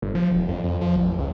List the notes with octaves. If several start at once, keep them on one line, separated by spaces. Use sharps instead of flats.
G1
F3
E1
F2
F2
F3
A1
C#2